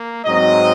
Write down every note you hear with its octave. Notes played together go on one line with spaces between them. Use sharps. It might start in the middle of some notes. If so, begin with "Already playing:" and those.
Already playing: A#3
G#2 F#3 C4 D#5